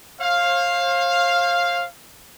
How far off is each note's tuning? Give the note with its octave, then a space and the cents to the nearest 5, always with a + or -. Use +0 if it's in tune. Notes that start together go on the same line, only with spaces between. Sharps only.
C5 +45 F5 +0